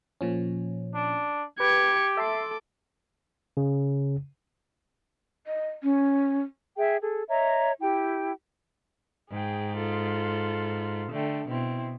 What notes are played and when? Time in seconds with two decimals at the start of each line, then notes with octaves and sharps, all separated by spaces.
0.21 A#2 F3 C#4
0.95 D4
1.60 G4 B4 G#6 C#7
2.17 A4 E5 A5 C6 D6
3.57 C#3
5.47 D#5
5.83 C#4
6.77 G#4 E5 G5
7.00 G#4 A4
7.29 C#5 D#5 E5 A#5
7.79 E4 G4 G5
9.31 G#2 G#4 G5
9.76 F4 A4
11.12 D3 A3 G5
11.48 B2 C4 E4